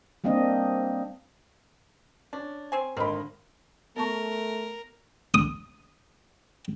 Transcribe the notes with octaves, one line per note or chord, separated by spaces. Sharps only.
G3 A#3 C4 D4 D#5
C#4 D4
C4 C5 G#5
G#1 D3 A#3 C4 F4 A#4 D#5 B5
A3 B3 A#4 A5 C#6
D#6